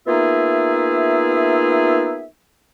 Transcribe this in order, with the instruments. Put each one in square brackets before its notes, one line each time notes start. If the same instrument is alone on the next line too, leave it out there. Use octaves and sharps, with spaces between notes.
[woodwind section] A#3 B3 D#4 F4 G#4 E5